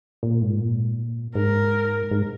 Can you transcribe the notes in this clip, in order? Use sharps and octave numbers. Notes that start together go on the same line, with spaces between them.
A#2
G#2
A#2
G#2 A#4
G#2